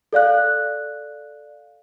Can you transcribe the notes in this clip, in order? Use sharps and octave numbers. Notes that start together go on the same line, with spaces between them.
A4 D5 F5 F#6